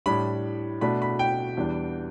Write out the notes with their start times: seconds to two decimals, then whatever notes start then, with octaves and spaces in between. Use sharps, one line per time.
0.06 A2 G3 D4 B5
0.81 B2 A3 D4 B5
1.02 B5
1.19 G5
1.57 E2 E3 G3 B3 D4